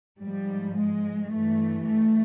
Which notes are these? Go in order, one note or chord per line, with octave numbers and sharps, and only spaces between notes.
G#2 F3 G3
G#3
G2 E3 A3
A3